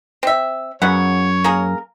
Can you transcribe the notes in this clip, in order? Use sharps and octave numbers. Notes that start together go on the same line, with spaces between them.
C4 E5
F#2 C#3 B3 C#5 F#5
A#3 G#4 A#4